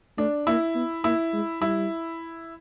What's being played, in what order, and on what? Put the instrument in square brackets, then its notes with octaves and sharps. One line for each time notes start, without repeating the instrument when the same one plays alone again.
[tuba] A3 [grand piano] D4
[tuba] A#3 [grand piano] E4
[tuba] B3
[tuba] A#3 [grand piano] E4
[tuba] G#3
[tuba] G3 [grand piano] E4